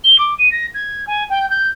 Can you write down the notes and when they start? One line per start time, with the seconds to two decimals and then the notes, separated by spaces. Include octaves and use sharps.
0.03 G7
0.18 D6
0.38 D#7
0.51 A#6
0.74 G#6
1.07 G#5
1.29 G5
1.49 G6